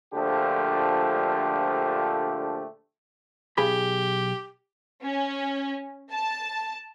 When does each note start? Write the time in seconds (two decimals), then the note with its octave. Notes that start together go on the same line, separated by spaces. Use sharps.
0.14 A#1 D3 F3 A3 G4
3.58 B1 G4 G#4 B5
5.03 C#4
6.11 A5